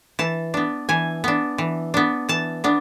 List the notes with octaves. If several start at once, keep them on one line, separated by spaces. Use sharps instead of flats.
E3 A5
B3 D4
E3 G#5
B3 D4
E3
B3 D4
E3 A5
B3 D4